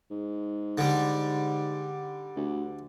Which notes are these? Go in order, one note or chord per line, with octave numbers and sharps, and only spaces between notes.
G#2
D3 G3
D2